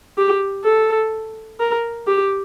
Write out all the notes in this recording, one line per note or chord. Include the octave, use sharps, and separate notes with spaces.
G4
A4
A#4
G4